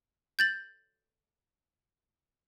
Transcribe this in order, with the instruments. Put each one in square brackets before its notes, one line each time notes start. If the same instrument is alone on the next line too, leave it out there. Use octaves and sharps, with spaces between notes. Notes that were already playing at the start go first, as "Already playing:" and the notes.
[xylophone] G6 A6 F#7